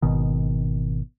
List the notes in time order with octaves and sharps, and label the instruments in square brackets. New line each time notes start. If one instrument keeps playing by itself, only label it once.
[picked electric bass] G#1 B2 D#3